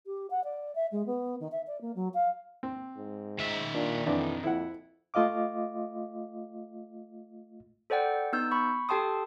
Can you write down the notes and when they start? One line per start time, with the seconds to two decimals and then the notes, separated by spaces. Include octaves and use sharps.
0.06 G4
0.31 F#5
0.44 D5
0.75 E5
0.92 G#3
1.06 B3
1.40 D#3
1.52 E5
1.67 D5
1.81 A#3
1.96 F#3
2.14 F5
2.63 C4
2.97 G#2
3.39 D#3 E5
3.74 A#2 D4
4.06 F2 D3 E3 D5
4.44 F2 E4 F#5
5.14 A3 F4 D#5 F5 D6
7.90 A4 C5 D5 F#5 G5
8.33 B3 D#4 E6 G6
8.51 B5 C#6
8.89 G4 A4 G5 A5 C6 D#6